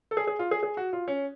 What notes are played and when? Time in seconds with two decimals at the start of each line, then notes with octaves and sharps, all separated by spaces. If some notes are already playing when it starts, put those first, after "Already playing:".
0.11 A4
0.17 G#4
0.27 G#4
0.39 F4
0.51 G#4
0.63 G#4
0.77 F#4
0.93 F4
1.08 C#4